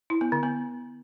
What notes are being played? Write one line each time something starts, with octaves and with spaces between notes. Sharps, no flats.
E4
B3
D3
B3